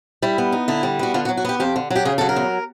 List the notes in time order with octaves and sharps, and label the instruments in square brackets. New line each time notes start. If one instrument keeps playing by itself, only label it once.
[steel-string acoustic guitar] G3 E4
B3
D#4
D3 E4
G3
B3 F#4
D3 F4
F#4
F#3
F#4
B3 G4
F2 G4
D3
F#3
G4
C#3 G#4
F#3 A4
A#4
E2